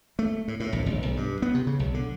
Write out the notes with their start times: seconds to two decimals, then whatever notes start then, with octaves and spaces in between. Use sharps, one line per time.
0.19 A3
0.48 A2
0.60 A2
0.73 A#1
0.86 G1
1.03 B1
1.17 G2
1.42 B3
1.54 C3
1.67 C#3
1.79 B1
1.94 D3